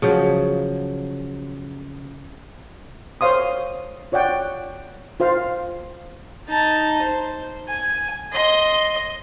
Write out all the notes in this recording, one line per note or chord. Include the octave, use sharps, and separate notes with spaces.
C#3 F3 F#3
C5 C#5 F5 C6 D#6
F4 C#5 D5 F#5 G5
F4 C5 F5
D#4 A5
C5
G#5
D#5 C6